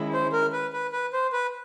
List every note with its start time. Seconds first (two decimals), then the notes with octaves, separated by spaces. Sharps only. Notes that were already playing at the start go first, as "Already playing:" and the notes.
Already playing: D#3 G#3 C#4 E4
0.13 C5
0.32 A#4
0.53 B4
0.73 B4
0.92 B4
1.13 C5
1.33 B4